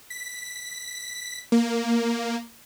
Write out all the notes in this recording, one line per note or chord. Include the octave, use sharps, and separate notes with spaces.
B6
A#3